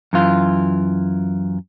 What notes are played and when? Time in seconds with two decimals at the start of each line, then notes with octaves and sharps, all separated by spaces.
0.13 F#2 E3 F4